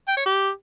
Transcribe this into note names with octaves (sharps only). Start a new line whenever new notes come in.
G5
C#5
G4